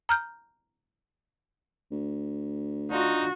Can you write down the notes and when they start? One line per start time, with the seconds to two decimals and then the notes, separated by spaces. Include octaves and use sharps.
0.09 A#5 F6 G6
1.92 D2
2.91 D4 D#4 F4 F#4